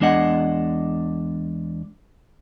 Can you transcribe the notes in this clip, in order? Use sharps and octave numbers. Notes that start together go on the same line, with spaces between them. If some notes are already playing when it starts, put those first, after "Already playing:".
E2 G#3 D4 D#5 F#5